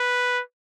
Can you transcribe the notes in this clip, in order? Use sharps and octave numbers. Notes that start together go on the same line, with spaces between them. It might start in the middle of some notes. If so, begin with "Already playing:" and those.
Already playing: B4